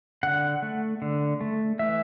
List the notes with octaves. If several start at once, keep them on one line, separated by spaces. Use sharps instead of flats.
D3 F#5
A3
D3
A3
E3 E5